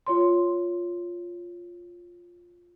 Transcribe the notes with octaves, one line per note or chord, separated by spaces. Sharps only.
F4 C#5 C6